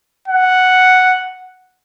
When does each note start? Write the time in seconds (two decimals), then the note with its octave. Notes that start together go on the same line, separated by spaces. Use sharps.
0.28 F#5